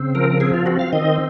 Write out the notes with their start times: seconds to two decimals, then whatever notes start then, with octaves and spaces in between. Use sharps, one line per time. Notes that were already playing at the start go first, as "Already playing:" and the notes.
Already playing: C#3 C4
0.15 F3 A#4
0.40 C4 G#4
0.54 F4
0.66 C4 F#4
0.79 F5
0.93 D#3 D#5